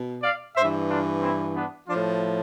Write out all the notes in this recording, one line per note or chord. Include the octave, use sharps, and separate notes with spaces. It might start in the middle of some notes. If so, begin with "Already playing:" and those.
Already playing: B2
D5 F5
G2 E3 C5 E5
D4 F4
C4 E4
B3 D4
A2 F3 D4 F4